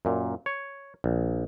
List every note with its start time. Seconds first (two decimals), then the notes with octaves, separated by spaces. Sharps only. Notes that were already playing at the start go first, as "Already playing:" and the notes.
0.05 F#2 A#2
0.46 C#5
1.04 A#1